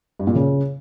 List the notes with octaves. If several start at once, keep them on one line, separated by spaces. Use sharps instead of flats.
G2
A#2
C#3